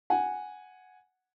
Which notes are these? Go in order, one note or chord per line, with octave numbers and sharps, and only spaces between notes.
F#5 G#5